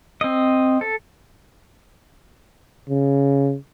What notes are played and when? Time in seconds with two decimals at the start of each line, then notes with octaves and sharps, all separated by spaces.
0.21 C4 D#5
0.81 A4
2.90 C#3